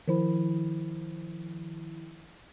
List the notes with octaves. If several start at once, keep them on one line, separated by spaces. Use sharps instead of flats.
D#3 F3 E4